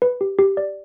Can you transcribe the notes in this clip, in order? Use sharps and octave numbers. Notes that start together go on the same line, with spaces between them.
B4
G4
G4
D5